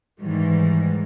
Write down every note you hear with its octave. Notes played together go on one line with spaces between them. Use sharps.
G#2 D#3 E3 G3